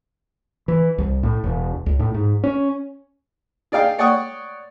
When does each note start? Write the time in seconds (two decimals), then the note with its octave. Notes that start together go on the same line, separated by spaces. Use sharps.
0.68 E3
0.98 C2
1.23 A2
1.44 E1
1.86 C#2
1.99 A2
2.14 G#2
2.44 C#4
3.72 G#4 D5 D#5 F5 G5
3.98 C#5 D5 F#5 G5 C#6 D#6